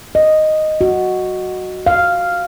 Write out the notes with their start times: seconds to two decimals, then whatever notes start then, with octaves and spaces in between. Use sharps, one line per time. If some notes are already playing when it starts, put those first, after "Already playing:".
0.15 D#5
0.81 F#4
1.86 F5